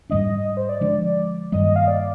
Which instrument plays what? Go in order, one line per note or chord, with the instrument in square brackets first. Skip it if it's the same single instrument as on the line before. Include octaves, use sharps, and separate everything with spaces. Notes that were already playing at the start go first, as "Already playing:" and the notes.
[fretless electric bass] G#2 G3 A#3 D4 [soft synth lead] D#5
[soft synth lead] D#5
C5
D5
[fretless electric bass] D3 F3 G#3 D4
[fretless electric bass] G2 D#3 G3 A#3 [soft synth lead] D#5
[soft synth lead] D#5
F5
D5